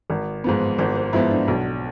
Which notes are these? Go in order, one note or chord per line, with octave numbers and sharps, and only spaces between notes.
G#1
G#2 F3 B3
G#1 C5
C5
G#2 F3 B3 E4
D4
B1